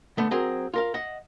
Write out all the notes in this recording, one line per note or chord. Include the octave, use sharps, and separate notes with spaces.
D3 A3 B3
F#3 C4 G#4 A#4
F4 A#4 F5
D#5 E5 F#5